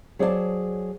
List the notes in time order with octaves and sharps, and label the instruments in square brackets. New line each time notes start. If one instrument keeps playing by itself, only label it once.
[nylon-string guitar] F#3 G#4 C5 D5 G5 A5